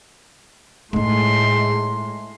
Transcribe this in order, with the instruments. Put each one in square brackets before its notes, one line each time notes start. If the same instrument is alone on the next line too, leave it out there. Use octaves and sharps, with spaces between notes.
[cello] A2 [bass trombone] G#3 [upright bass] A3 D#4 [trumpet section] C6